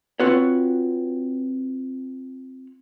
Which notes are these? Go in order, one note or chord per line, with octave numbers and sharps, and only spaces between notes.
C4 F4 F#4 B4 C#5